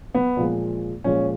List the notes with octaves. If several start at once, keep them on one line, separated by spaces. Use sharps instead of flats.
B3
A#2 F3 G#3
A#2 F3 G#3 C#4